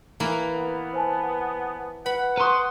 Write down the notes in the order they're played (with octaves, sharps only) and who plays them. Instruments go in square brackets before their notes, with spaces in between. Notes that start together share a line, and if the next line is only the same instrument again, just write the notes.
[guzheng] E3 A#3 E4
[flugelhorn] B3
[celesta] C5 G#5 A5
[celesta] B4 [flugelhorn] F#5 [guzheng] B5
[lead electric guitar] B4 C6 [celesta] A#5 C#6 D#6